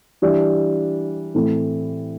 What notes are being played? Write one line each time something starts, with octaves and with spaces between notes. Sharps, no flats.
E3 G3 D4
A2 E3 C4 E4 A4